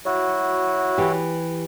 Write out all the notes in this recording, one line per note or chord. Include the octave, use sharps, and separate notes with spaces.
F#3 E4 F#4
E3 G4